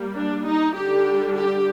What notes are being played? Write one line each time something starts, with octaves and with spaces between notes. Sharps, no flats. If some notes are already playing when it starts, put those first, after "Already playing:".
Already playing: G3 A#3
D4
D#4
D3 G3 D4 G4
G4